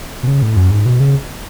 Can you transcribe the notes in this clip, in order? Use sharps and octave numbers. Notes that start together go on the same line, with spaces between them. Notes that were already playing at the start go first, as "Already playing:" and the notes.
B2
C#3
A2
F#2
G#2
B2
C#3